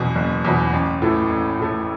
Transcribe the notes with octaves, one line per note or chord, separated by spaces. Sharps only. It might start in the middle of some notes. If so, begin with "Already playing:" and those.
Already playing: F#1 E2 B2
F#1
E2 B2
A1
A2 E3 A3
A1
A2 E3 A3